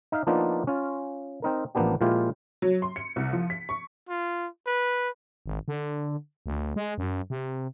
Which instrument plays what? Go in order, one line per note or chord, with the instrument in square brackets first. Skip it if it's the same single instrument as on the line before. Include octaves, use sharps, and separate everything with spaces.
[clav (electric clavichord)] D#4 E5 F5
F3 A#3 B3 D4 D#4 F4
C#4 F4
C4 D#4 A#4
A1 F3 A#3 B3 D4 G4
A#2 F3 G#3 E4 F4 G4
[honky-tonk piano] F#3
C6
C#7
C2
F3
B6
C#6
[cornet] F4
B4
[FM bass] G#1
D3
D2
G#3
F#2
C3